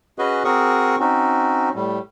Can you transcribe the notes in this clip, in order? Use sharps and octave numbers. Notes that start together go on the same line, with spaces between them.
C#4 F#4 G#4 B4 D#5
C4 F#4 G#4 A#4 C#6 D#6
C4 C#4 D#4 F#4
A2 G3